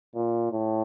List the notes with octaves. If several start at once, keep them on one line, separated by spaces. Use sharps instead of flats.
A#2
A2